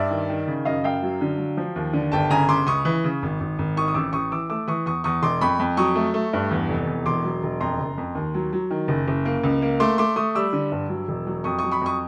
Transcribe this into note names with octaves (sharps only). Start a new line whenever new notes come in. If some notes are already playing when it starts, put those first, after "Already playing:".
Already playing: G2 D5 E5
D#3
D#3
C#3
F#2 D#5 F5
F#2 F5 G5
F#3
D3
F#3
F3
D#2
D3
G1 G5 A5
C#3 G#5 A#5
C#3 C6 D6
C#2 C#6 D#6
E3
C#3
G#1
G#1
G#1
D#3 C#6 D#6
D#6
A1 D6 E6
A1 C#6 D#6
E3 D6 E6
A3 D6 E6
E3 C#6 D#6
E2 C#6 D#6
E2 C#6 D#6
E1 C6 D6
F2 B5 C#6
F2
F#3 C#6 D#6
A3
A3
G2
E2
F1
E2
E1 C6 D6
F#3
E1
F2 A#5 C6
F#1
F2
D#2
F#3
F#3
D#3
F#1
F#1
A#3
C#2
A#3
A3 C6 D6
A3 C6 D6
A3 C#6 D#6
G3 D6 E6
D3
G2
F#3
E1
F#3
F2 C#6 D#6
F#3 C#6 D#6
B5 C#6
F2 C#6 D#6